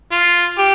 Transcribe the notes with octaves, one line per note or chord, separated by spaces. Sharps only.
F4
G4